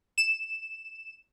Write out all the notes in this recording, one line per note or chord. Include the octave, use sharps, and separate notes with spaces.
E7